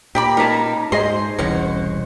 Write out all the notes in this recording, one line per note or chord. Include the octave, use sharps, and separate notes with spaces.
A#2 G4 D5 A#5 B5
C#3 D#4 A#4 B4 A5
G#2 G#4 C5 D#5 C6
E1 C2 B2 E3 C#4 F#4